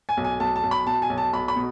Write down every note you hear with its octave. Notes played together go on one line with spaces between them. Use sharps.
G#5
B1
G#5
B1 A5
A5
B1
B5
B2 A5
G#5
B1
A5
B1 B5
B5
B2